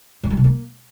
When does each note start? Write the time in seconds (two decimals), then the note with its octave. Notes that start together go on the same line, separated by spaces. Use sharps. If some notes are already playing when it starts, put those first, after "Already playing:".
0.23 G2
0.30 G3
0.37 C3
0.44 A#3